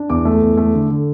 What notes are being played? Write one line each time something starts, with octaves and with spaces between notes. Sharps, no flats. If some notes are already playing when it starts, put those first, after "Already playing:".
Already playing: D4
E2 D6
A3
E2
A3
D3
D3